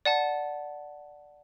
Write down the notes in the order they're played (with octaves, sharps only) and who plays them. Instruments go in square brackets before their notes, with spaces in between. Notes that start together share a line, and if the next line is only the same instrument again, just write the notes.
[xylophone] D5 F#5 A5